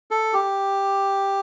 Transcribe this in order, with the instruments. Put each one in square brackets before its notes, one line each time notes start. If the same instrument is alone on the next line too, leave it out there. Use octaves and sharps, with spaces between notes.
[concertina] A4
G4